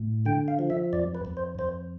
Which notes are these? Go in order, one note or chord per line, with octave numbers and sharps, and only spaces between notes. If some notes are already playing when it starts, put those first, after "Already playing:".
Already playing: A2
D3 G5
F5
F3
E5
F2 D5
B4
F2
C5
F2 C5